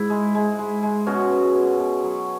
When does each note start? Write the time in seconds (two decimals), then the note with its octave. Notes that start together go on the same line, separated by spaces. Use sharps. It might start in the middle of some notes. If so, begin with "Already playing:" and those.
Already playing: G#2 E4
0.10 G#3
0.35 G#3
0.59 G#3
0.83 G#3
1.07 B2 C#4 F#4
1.32 B2
1.55 B2
1.79 B2
2.04 F#3